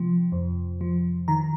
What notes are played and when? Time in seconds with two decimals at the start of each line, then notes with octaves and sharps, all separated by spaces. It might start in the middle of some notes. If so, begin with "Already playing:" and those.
Already playing: C3 F3
0.32 F2
0.81 F3
1.28 D#3 A#5